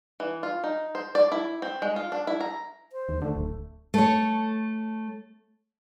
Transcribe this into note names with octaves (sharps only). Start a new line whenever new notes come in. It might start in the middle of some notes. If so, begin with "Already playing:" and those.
E3
F4
D#4
C5
D5
E4
C4
G#3
F4
D4
E4
A#5
C5
D#2
D3 A3
D1
A3 C#5